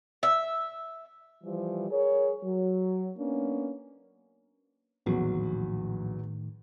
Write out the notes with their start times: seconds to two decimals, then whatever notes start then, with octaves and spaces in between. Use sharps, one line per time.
0.23 E5
1.44 E3 F3 G3
1.91 G#4 A#4 C#5
2.44 F#3
3.18 A#3 B3 C#4 D4
5.06 A#1 E2 A2 D#3 F#3